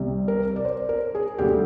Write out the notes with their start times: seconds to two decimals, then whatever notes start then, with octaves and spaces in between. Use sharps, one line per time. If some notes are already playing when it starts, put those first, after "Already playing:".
Already playing: C2 C3 G3
0.28 A#4
0.56 D5
0.65 C5
0.89 A#4
1.15 G#4
1.38 D2 D3 G3 G4